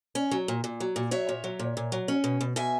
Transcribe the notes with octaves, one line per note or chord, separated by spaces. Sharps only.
C#4
F#3
A#2
A#2
F#3
A#2
F#3 C#5 E5
A#2
F#3
A#2
A#2
F#3
C#4
B2
B2
B2 E5 G#5